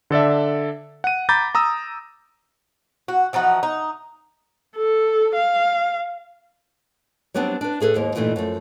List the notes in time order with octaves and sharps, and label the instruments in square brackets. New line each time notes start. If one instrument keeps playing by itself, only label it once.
[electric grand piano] D3 A4 D5 E5
F#5 D#7
A#5 B5 D6 G6 A6
A#5 D#6 E6
[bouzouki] F#4
E3 F3 D#4 F#4
D#4
[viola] A4
F5
[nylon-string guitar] F#3 G3 B3 C4 D4
D4 B4
A2 G#4 A4 B4
D#2 G#2 A#3
G2 A#2 E3 A3 D#4
F#2 F3 A3